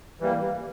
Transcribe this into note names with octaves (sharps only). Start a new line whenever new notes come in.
E3 G3 A#3